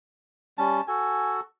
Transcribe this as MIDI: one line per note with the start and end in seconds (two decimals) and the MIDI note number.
0.58 0.81 55
0.58 0.81 61
0.58 0.83 81
0.88 1.40 66
0.88 1.40 69
0.88 1.39 80